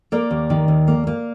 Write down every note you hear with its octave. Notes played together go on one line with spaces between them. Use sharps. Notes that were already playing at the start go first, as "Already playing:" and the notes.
A#3 A#4 D5
D#2
D#3
D#2
A#3
A#3